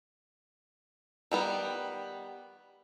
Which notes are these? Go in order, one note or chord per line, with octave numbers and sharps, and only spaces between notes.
D#3 G3 B3